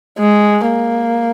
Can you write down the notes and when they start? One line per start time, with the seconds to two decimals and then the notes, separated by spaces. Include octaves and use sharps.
0.19 G#3
0.66 A#3